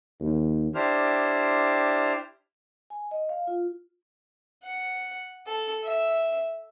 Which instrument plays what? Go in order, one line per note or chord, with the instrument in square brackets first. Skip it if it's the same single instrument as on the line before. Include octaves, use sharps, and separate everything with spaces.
[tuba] D#2
[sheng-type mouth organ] D4 E4 G4 C5 F6
[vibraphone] G#5
D#5
F5
F4
[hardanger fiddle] F#5
A4
E5